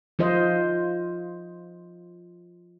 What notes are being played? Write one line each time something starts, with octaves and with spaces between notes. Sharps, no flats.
F3 F4 C5 D#5